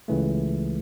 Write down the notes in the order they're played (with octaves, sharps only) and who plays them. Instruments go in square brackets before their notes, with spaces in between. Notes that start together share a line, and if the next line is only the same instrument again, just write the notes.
[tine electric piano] C#2 C#3 E3 A3